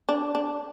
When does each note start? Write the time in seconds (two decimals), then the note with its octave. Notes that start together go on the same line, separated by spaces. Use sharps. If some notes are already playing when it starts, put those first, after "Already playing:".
0.09 D4
0.35 D4